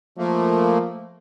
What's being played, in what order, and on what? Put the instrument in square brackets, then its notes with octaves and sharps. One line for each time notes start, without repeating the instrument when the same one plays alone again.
[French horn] F3 [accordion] A3 A#3